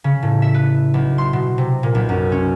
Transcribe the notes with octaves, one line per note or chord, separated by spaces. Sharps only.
C#3
A2
E5
B4
B1
C6
B2
C3
A#2
B1
F#2
C#4